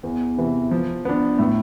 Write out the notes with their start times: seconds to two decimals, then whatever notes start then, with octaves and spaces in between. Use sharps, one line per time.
0.03 E2
0.38 C3 E3
0.71 F3
1.05 B3 D4
1.39 A2